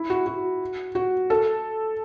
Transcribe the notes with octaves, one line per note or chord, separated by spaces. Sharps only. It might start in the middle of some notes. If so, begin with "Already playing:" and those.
Already playing: E4
F#4
F#4
F#4
A4